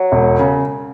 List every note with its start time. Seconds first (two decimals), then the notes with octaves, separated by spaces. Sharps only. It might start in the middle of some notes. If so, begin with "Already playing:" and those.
Already playing: F#3
0.12 E1
0.39 C#3